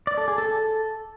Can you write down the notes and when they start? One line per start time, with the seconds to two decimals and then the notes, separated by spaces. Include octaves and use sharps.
0.07 D5
0.18 A4
0.28 G#4
0.38 A4